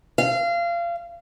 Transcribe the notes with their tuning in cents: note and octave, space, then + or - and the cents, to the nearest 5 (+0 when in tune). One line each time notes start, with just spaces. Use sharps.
F5 -25